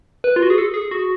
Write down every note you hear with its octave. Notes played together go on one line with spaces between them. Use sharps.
B4
F4
F#4
G#4
A4
G#4
F#4